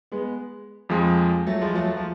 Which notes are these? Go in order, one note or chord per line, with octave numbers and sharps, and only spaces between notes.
G#3 B3
F2 F3 G#3
F#3 A3
F3 G#3
F#3 A3
F3